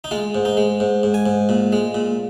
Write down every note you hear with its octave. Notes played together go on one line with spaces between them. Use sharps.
D#4
G#3 F4
G#2
D#4
G#3
G#2
G#2
G#5
G#2
A#2
G#3
A#2